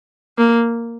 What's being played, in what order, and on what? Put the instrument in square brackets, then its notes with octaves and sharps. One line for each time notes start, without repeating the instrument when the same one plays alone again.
[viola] A#3